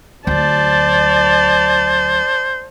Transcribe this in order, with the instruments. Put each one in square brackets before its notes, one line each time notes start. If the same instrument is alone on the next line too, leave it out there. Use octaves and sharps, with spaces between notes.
[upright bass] D2 F#3 [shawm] C5 [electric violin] D5 A5